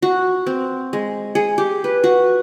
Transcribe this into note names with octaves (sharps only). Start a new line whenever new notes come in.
F#4
C4
G#3
G#4
G4
B4
F#4